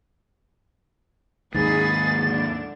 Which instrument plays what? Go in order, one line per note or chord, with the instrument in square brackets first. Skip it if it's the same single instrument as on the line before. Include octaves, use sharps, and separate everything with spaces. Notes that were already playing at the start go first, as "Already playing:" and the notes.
[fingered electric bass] D#2 G#2 [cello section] D#4 G#4 B4 [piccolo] A6
[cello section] D3 D4